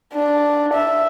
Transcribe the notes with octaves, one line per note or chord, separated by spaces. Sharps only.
D4
E5